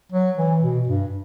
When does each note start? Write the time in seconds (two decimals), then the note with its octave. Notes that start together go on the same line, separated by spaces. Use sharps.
0.12 F#3
0.38 E3
0.62 B2
0.88 G2